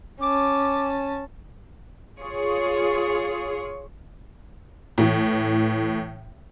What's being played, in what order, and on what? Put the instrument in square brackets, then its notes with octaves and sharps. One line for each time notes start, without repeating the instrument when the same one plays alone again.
[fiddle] C#4 A5 [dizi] D6
[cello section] F4 G#4 C#5
[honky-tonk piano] A2 E3